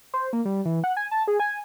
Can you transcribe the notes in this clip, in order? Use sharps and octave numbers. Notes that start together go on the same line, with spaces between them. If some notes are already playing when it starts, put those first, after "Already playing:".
C5
A#3
G3
E3
F#5
G#5
A5
G#4
G#5